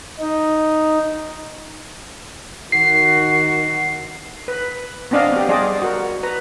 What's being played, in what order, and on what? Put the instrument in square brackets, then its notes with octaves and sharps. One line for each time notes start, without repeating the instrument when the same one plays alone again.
[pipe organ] D#4
[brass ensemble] D#3 F#4 [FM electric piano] C7
[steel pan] B4
B3 C4 D4 D5 D#5 F5
B3 G4
G3 G#4 C5 D5 D#5
F#4 A#4
B4 A#5